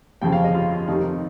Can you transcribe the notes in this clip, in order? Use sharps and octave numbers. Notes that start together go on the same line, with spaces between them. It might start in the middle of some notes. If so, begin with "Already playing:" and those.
G1 F2 C#3 F3 G5
F5
D#5
F4
F4
F1 F2 C3 D#3 D#4